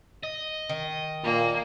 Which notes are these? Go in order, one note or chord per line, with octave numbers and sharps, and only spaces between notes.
D#5
D#3
A#2 A#3